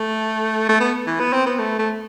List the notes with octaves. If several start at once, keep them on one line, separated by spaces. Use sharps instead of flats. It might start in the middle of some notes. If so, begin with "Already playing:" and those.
Already playing: A3
A3
B3
E3
B3
C4
B3
A3
A3